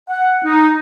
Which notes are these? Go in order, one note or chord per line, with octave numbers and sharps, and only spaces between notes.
F#5
D#4